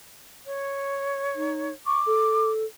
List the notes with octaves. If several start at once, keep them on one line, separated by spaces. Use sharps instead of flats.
C#5
D#4
C#6 D6
A4